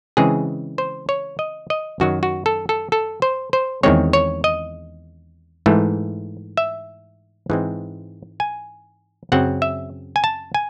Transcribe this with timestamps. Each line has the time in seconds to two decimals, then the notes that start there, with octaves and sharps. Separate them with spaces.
0.17 C#3 E3 G#3 C4 G#4
0.78 C5
1.09 C#5
1.39 D#5
1.70 D#5
2.00 F#2 D#3 F#3 F#4
2.23 F#4
2.46 A4
2.69 A4
2.92 A4
3.22 C5
3.53 C5
3.83 E2 D#3 G#3 C4 C#5
4.13 C#5
4.44 D#5
5.66 G#2 E3 A3
6.57 E5
7.50 G#2 E3 G#3 C4
8.40 G#5
9.32 F#2 C#3 F#3 C4 F#5
9.62 E5
10.16 G#5
10.24 A5
10.54 G#5